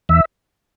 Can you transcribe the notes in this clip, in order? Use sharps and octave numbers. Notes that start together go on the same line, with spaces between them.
E2 E5